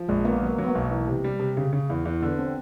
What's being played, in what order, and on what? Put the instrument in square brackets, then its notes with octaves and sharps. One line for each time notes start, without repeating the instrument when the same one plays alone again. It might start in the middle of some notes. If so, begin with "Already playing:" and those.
Already playing: [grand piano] F3
[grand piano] A#1 [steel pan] G#3
[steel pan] A#3 [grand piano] B3
[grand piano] F#3 [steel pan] A#3
[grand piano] F#3
[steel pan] B3
A#3
[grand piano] B1
E3
C3
G3
C3
C#3
C#3
E2
E2
[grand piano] D3 [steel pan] B3
[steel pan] C4